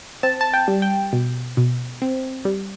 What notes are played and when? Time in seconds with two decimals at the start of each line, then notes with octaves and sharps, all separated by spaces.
0.23 C4 A5
0.41 A5
0.54 G5
0.68 G3
0.82 G5
1.13 B2
1.57 B2
2.02 C4
2.45 G3